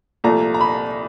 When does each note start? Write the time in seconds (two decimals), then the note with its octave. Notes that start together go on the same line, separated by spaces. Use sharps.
0.24 C2 A#2 F3 A3 A#5
0.54 A#5
0.61 B5